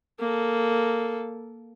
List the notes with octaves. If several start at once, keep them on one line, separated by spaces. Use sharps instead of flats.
A#3 A4